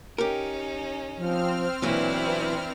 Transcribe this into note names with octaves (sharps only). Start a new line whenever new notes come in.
C#4 D#4 G4 A#4
F3 C4 F6
B1 A#2 E3 F#3 D4 E4 B4